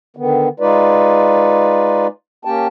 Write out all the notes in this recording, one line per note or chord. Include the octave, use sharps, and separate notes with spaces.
D3 D#3 B3
G#3 D#4 F4 B4 D5
A#3 C#4 G4 G5 A5